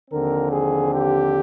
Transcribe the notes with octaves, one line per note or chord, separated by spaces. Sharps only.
D#2 D3 F3 C4 A#4
G#4
G4